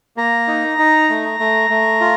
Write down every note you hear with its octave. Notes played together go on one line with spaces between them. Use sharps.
A#3 A#5
D#4
D#4
A3
A3
A3
F4